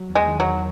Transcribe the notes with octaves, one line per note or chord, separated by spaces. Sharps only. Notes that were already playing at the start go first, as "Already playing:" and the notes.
Already playing: F#3
E2
G#3
D#3
F#3
E2